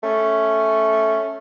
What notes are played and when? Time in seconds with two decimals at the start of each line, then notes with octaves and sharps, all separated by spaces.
0.03 A3 C#4